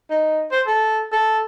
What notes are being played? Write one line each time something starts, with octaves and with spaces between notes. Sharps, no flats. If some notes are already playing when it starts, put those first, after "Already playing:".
D#4
C5
A4
A4